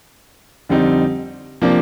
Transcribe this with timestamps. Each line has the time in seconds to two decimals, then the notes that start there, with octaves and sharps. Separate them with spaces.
0.69 F2 D3 G3 C4 D#4
1.62 C3 F3 A#3 D4